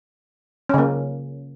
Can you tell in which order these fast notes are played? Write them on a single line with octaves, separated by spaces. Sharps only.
C#4 C#3 A#3